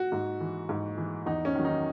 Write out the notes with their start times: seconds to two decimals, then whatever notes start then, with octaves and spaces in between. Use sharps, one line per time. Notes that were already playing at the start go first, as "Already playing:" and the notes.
Already playing: F#4
0.12 G#2
0.40 E3
0.69 G#2
0.98 E3
1.26 E2 D#4
1.45 C#4
1.55 D#3 F#3
1.65 D#4